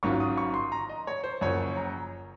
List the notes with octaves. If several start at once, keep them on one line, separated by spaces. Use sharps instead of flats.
G#1 G#2 F#3 C#4 F4 C#6
D#6
C#6
C6
A#5
D#5
C#5
C5
F#1 F#2 F3 C#5
A#5